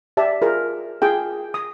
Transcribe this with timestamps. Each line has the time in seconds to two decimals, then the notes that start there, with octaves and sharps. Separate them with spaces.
0.17 G4 D5 E5 A5
0.42 F4 G#4 A#4 C5
1.02 F4 G#4 G5
1.54 D#6